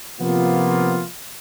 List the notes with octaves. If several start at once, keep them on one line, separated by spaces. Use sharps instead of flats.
C3 F3 A#3 B3 F4